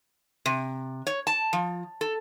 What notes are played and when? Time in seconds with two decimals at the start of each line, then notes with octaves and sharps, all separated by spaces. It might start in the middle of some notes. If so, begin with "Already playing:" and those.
0.46 C3
1.07 C#5
1.27 A5
1.53 F3
2.01 A4